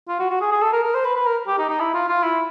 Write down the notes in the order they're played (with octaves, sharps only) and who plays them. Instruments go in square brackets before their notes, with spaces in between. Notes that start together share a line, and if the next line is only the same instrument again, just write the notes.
[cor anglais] F4
F#4
F#4
G#4
G#4
A4
A#4
A#4
C5
B4
B4
A#4
G4
D#4
D#4
E4
F4
F4
E4